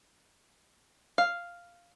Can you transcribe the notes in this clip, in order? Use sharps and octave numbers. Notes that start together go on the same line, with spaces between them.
F5